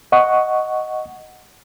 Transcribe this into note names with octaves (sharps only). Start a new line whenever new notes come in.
D#5 F#5 C#6